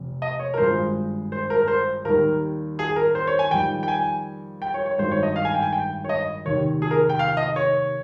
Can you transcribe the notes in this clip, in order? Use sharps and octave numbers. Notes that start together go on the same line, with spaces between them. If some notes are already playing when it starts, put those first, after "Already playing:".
Already playing: F1 F2 C3
D#5
C#5
A#4
G#1 G2 F3 G#3 C5
C5
A#4
A#4
C5
D#2 D#3 G3 A#4
G#4
A#4
C5
C#5
G#5
F2 D#3 G3 G5
G5
G#5
G5
C#5
C#5
G#1 G2 D#3 G3 C5
C#5
D#5
F5
G#5
G5
G#5
G5
C#5
D#5
F1 D#2 D#3 C#5
G#4
A#4
G5
F5
D#5
C#5